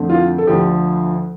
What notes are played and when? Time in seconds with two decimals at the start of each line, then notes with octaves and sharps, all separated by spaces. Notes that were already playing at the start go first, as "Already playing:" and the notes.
Already playing: F2 D3 A3 C4
0.09 F4
0.38 A4
0.47 D2 D3 F3 G4